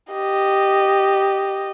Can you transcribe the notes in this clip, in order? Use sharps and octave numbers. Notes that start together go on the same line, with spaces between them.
G4 D#5